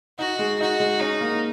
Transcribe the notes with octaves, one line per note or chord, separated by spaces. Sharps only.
D#4 F#4
G#3
D#4 F#4
G#3
C#4 D#4
A#3